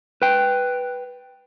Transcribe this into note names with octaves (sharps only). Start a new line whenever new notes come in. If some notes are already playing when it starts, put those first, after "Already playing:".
B4 G5